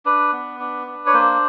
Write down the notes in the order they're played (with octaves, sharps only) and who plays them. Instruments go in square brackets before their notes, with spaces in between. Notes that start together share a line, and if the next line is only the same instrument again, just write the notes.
[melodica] D4 B4
B3
D4
D4
C#5
A#3 C5